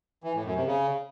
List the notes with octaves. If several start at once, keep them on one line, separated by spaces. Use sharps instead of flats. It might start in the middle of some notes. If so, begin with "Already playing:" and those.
E3
A2
F#2
C3
C#3